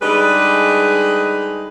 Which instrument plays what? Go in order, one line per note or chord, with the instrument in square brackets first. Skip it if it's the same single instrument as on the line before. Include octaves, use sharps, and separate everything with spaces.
[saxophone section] D3 G3 G#3 D#4 G#4 B4